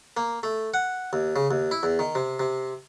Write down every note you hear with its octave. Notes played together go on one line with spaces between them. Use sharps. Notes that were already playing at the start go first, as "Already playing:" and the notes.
A#3
A3
F#5
D#2
C#3
D#2
E4
E2
D#3
C3
C3